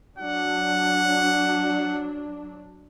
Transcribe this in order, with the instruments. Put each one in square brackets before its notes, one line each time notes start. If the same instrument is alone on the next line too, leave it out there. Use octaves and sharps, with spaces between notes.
[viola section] F#3 D4 [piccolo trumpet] F#5